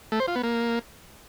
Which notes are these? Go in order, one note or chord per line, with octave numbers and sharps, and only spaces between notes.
A3
C5
F4
B3
A#3